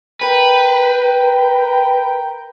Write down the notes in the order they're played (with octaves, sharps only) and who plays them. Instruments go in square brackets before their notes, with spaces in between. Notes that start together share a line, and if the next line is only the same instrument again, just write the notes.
[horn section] A#4 G5 [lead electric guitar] B4